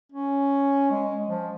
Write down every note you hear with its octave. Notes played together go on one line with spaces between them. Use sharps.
C#4
G#3
F3